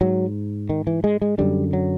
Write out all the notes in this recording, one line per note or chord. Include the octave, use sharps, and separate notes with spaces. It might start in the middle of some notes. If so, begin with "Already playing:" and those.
G#2 F#3
D#3
E3
G#3
G#3
F#2 D3 G3
F#3